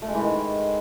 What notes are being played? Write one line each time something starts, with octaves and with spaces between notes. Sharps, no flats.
A3
G#3
E3
D#3